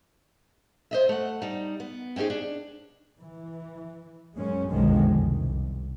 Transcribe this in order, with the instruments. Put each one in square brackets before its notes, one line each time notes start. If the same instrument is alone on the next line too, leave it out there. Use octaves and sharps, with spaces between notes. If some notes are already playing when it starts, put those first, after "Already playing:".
[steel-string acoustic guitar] C5 D#5 E5
A3 F#5
G3 D#4
B3
C4 C#4 D#4 G4 G#4
D4
[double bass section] E3
F#2 G#3 C#4
B1 F2 D3 D#3 F3 G#3
C2